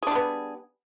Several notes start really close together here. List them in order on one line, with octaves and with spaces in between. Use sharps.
G#4 D4 G3 B3